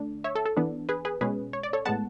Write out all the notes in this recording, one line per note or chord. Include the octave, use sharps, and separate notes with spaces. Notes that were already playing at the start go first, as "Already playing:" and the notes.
Already playing: D3 A3 D4
C#5 E5
A4
A4
E3 B3 D4
G#4 B4
G#4 B4
B2 G#3 C#4 G#4 B4
C#5
D5
A4 C#5
A2 G#3 B3 F#5 A5